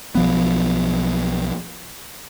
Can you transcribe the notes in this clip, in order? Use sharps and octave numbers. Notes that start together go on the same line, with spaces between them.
B1 F3 B3